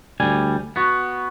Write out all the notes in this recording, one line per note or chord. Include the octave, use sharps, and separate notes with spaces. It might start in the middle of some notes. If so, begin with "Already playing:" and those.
D2 G3 G#5
B3 F#4